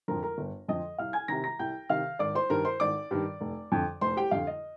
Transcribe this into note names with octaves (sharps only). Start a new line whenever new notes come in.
F2 D3 F3 A#4 A#5
A#4 A#5
G1
F2 D3 F3 D#5 D#6
C2 F5 F6
G#5 G#6
C3 D#3 A#5 A#6
A#5 A#6
C2 G5 G6
C3 D#3 F5 F6
G#1 D5 D6
C5 C6
G2 D#3 A#4 A#5
C5 C6
G#1 D5 D6
G2 D#3
F1
F2 D3
F1 C5 C6
G4 G5
F2 D3 F5
D#5